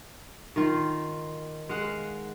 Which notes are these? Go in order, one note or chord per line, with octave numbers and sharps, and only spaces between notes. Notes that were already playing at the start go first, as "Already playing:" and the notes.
D#3 F4
G#3 F5 F#5